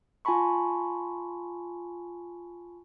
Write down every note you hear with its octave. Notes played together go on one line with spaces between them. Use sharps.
F4 G#5 A5 B5 C#6